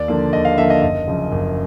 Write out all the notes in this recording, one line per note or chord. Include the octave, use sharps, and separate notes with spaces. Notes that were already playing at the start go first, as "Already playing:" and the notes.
Already playing: D#2 D5
D3 F3 A#3
D#2 D#5
F5
D3 F3 A#3 E5
D#5
F#1 D#5
F#2 C#3 F3
F#1